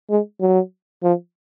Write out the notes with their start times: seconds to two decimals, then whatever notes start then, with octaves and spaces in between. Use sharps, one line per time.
0.10 G#3
0.41 F#3
1.03 F3